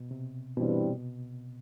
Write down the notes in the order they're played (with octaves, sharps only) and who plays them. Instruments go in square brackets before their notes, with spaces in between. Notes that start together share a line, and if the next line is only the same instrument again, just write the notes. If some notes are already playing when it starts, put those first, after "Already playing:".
Already playing: [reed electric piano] B2
C3
[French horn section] G2 E3 G3 C4 E4 [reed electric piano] B2